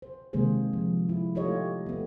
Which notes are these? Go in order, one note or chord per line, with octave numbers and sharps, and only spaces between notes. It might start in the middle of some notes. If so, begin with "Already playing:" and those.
C5
C3 D#3 G#3 A#3 G#4 C5
F3
E4
A3 D#4 F4 G4 C#5 D#5
A3 B3